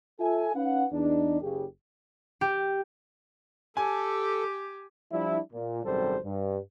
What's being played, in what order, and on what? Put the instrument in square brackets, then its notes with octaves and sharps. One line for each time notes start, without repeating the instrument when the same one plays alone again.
[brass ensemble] F4 A4 E5 G#5
C#4 D#4 B4 F5 F#5
E2 D4 D#4
F#1 C#3 G4 G#4
[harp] G4
[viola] G4 [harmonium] A4 [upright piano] G#5
[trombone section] F3 G3 D4 E4
A#2
G#1 F#2 C3 G3 A4 C5
G2